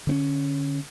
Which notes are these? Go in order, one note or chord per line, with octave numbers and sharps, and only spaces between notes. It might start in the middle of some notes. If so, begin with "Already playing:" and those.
D3 C4 C#4